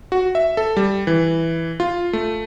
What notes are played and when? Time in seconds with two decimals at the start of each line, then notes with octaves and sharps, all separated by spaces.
0.12 F#4
0.35 E5
0.57 A4
0.77 G3
1.07 E3
1.80 F4
2.13 A3